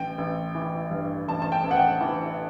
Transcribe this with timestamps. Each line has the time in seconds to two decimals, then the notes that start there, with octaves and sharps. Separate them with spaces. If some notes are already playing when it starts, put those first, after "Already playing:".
Already playing: A1 G5
0.18 A1
0.55 E3
0.91 G2
1.28 A1 A5
1.42 A5
1.52 G5
1.64 A1
1.71 F#5
1.77 G5
2.01 E3